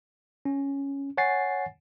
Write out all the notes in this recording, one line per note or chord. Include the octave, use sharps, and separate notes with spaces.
C#4
C#5 F#5 G#5 A6 C7